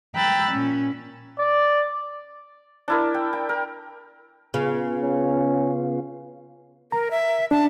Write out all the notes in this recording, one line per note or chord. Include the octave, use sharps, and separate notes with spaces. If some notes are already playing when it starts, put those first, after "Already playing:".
G5 A#5 B5 E6 F#6 A6
A#2 C#4
D5
D4 E4 A#4
G5
G5
A#4
C#3 B3 F4
C#4
A#4 A#5
E5
D4 A5